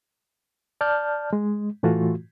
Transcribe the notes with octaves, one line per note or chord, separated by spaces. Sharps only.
D5 A5 F6 G6
G#3
A2 E3 A3 F4 F#4